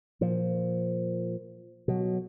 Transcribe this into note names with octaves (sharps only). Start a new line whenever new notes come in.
A#2 F3
B2 F#3